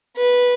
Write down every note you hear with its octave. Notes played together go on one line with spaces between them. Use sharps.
B4